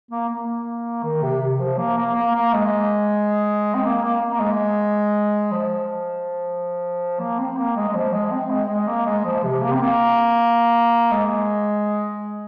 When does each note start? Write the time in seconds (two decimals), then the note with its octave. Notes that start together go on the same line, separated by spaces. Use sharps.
0.11 A#3
0.29 A#3
1.04 D#3
1.23 C3
1.41 C3
1.60 F3
1.78 A#3
1.98 A#3
2.15 A#3
2.35 A#3
2.53 G#3
3.75 C4
3.84 A#3
4.03 A#3
4.21 A#3
4.33 A#3
4.39 G#3
5.52 F3
7.20 A#3
7.39 C4
7.57 A#3
7.76 G#3
7.89 G#3
7.94 F3
8.13 G#3
8.31 C4
8.51 G#3
8.69 G#3
8.87 A#3
9.06 G#3
9.25 F3
9.44 C3
9.63 A#3
9.72 C4
9.81 A#3
11.11 G#3